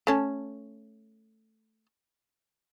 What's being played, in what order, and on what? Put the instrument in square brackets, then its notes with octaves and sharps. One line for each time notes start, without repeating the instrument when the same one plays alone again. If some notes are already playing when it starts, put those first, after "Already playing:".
[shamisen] A3 C#4 A5